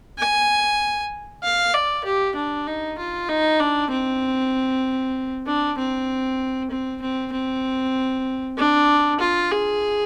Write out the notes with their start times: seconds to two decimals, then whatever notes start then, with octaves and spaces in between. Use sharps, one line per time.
0.18 G#5
1.43 F5
1.73 D5
2.04 G4
2.36 D4
2.67 D#4
2.98 F4
3.29 D#4
3.60 D4
3.91 C4
5.47 D4
5.78 C4
6.70 C4
7.01 C4
7.32 C4
8.57 D4
9.20 F4
9.51 G#4